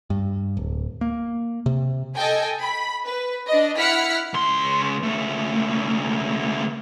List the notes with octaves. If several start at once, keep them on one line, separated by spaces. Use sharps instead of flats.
G2
D1
A#3
C3
A4 D#5 G5 G#5
B5
B4
D4 D#5
E4 F#5 F6 B6 C#7
C#2 C6
C#2 A3